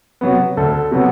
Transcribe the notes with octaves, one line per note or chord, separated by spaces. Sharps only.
C3 F#3 B3
D2 A4
C3 F#3 B3